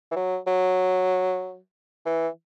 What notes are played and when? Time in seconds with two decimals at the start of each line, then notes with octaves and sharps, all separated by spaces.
0.11 E3
0.16 F#3
0.47 F#3
2.05 E3